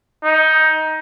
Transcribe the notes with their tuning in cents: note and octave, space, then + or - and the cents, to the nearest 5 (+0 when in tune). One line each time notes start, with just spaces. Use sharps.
D#4 +15